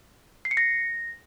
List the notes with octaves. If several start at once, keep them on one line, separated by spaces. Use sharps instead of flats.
C7
C#7
A#6